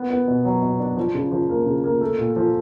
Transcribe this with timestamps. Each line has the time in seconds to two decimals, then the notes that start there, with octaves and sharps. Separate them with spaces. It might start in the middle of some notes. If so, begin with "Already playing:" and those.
Already playing: B3
0.10 B3
0.28 B2
0.45 F#3
0.62 B2
0.80 D4
0.97 F3
1.14 C#3
1.31 F3
1.49 A#3
1.66 C#3
1.84 A#3
2.01 A3
2.18 A#2
2.36 F3